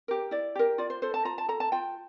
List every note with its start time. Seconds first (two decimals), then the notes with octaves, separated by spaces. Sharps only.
0.08 G4 A#4
0.31 E4 D5
0.56 G4 A#4
0.78 F4 D5
0.90 C5
1.02 A4 C5
1.14 A5
1.25 F4 A#5
1.38 A5
1.48 A4 A#5
1.60 A5
1.72 F4 G5